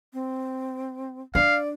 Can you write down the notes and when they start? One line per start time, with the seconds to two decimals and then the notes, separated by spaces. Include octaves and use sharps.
0.13 C4
1.35 D4 D5 F5